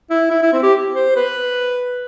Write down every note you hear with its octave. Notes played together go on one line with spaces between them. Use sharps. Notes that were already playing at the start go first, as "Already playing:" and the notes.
E4
E4
E4
C4
G4
C5
B4